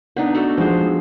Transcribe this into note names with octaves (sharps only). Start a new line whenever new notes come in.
B3 D4 D#4 F#5
A3 F#4 A4
F3 G#3 B3 C5